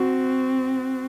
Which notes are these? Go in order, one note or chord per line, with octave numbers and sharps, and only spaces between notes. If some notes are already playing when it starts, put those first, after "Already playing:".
Already playing: C4 F#4